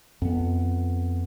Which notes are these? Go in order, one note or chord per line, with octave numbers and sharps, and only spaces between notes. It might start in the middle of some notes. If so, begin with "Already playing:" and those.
F2 B3